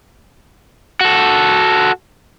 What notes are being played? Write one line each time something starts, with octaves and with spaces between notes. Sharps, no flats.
F#4 A4